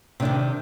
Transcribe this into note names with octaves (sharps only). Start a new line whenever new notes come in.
C3 D#3 D4